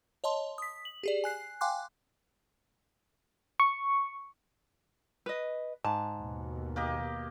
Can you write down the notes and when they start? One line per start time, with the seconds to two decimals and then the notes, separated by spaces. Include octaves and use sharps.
0.24 C#5 D#5 A5 C6
0.58 D#6 B6
0.85 F#7
1.03 G4 G#4 D5
1.24 G#5 F#6 C7
1.61 F5 G5 G#5 C6 D6 F#6
3.60 C#6
5.26 B4 D#5
5.85 G#2 A5
6.18 D#2 B2
6.76 A#3 G4 D#5